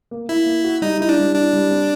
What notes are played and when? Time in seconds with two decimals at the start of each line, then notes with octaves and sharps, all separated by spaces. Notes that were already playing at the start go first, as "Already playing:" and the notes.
0.11 A#3
0.29 A#3 E4
0.46 A#3
0.64 F#4
0.82 G3 D#4
1.00 D#4 E4
1.09 D4
1.18 G3
1.35 D4 E4
1.53 G3
1.71 C4